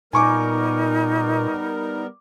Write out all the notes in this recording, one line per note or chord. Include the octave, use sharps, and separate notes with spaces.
A#2 G3 B3 D#4 A#4 G#5 C#6 D6